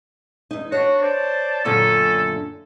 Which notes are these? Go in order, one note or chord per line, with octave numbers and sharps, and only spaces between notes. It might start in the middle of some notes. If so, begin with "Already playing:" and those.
E2 D#4
D4 F#4 C#5
C5 D5 A5
F#2 A#2 D3 B3 C#4 A4